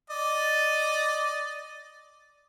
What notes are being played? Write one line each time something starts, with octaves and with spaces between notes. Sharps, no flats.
D5 D#5